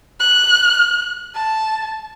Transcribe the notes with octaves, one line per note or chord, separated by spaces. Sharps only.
F#6
A5